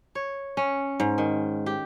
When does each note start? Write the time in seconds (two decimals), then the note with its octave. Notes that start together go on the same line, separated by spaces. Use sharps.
0.15 C#5
0.57 C#4
1.00 G#2
1.18 D#3
1.66 G4